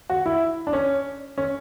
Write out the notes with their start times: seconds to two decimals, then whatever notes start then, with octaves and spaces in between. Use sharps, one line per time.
0.10 F#4
0.26 E4
0.67 D4
0.73 C#4
1.38 C#4